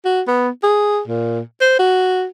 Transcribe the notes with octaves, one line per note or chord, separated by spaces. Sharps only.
F#4
B3
G#4
A#2
C5
F#4